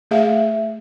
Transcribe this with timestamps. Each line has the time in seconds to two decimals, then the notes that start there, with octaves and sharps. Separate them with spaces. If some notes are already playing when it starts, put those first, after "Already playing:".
0.11 A3 G#4 E5 F5